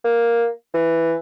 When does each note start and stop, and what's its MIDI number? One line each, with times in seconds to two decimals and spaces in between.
0.04 0.48 58
0.74 1.15 52